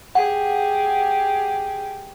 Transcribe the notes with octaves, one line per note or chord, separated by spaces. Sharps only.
G4 G#4 F#5